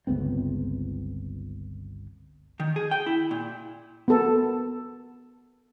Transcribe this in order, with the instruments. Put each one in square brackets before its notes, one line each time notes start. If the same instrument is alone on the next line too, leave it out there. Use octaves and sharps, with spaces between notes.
[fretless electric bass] G1 C#2 B3 C4
[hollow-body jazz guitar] D#3
G#4
G5
E4
A#2
[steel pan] B3 A4 A#4